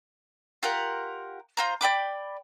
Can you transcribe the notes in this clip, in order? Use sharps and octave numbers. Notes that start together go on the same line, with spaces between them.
F4 G4 A#4 F#5
F4 C5 A#5
D5 G5 B5 D6